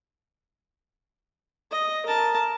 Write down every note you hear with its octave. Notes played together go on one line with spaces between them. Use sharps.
D#5
A#4 A5